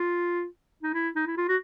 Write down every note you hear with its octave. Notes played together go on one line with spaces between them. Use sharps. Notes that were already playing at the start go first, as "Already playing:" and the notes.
Already playing: F4
D#4
E4
D#4
E4
F4
F#4